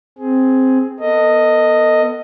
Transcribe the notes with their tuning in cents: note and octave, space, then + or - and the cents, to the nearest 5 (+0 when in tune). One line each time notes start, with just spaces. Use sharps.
C4 +0 G#4 +10
B3 -10 A4 +35 D#5 +0